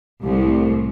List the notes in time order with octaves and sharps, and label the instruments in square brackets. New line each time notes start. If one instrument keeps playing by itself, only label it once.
[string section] C2 A2